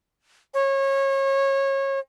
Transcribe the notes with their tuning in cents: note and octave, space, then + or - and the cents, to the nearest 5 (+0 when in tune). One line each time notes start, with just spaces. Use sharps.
C#5 -25